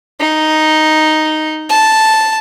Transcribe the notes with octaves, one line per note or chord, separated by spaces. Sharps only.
D#4
A5